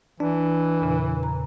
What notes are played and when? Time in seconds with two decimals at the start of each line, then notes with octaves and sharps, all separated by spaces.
0.20 E3 D4
0.81 E2 A#2 C#3
1.23 A#5